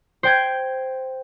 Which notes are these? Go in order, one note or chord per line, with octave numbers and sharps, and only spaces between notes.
C5 G5 G#6